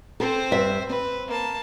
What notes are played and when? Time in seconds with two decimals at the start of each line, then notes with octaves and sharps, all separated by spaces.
0.20 C4 A4 C5
0.51 G2 E5
0.89 C4 B4
1.27 A#3 A5